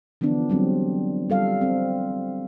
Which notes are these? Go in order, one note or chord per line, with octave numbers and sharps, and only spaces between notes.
D3 E3 F3 B3 D4
F#3 G3 C4
G3 A4 F5
C4 A4